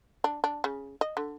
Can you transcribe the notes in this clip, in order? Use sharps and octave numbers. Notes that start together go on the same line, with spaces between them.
D4
D4
C#3
D#5
D3